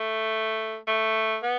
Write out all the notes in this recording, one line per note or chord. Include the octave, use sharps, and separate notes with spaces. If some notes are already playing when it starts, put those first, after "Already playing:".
Already playing: A3
A3
B3